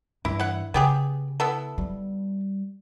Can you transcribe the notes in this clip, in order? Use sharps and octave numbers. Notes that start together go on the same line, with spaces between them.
G2 E3 E4
E4 F#5
C#3 B3 G4 G#4
B3 E4 A4
G3